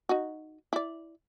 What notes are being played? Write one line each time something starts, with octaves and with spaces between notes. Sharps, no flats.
D#4 F#4
E4 D5